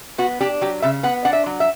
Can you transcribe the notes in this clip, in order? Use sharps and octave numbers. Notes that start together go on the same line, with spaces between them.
B3 F#4
D4 G4
F#3 G4
C#3 E5
B3 F#5
D4 F#5
E5
F#3
E5